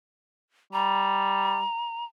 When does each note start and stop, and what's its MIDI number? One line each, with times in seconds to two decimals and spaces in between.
0.73 1.62 55
0.73 2.05 82